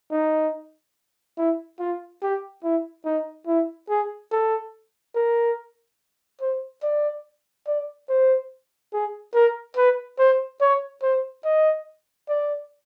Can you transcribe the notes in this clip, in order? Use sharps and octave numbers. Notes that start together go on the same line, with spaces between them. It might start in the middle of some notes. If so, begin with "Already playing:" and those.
D#4
E4
F4
G4
E4
D#4
E4
G#4
A4
A#4
C5
D5
D5
C5
G#4
A#4
B4
C5
C#5
C5
D#5
D5